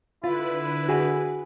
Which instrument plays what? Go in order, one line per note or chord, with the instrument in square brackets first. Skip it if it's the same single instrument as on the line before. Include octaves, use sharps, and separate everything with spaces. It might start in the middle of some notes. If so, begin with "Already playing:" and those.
[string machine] D3 B4 [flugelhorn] E4 [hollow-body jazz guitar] F4
[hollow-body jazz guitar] F#4 G#4